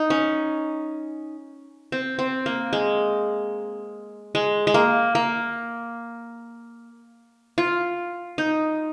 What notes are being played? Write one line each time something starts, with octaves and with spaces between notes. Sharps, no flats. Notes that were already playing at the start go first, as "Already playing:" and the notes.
Already playing: D#4
C#4
C4
C4
A#3
G#3
G#3
G#3
A#3
A#3
F4
D#4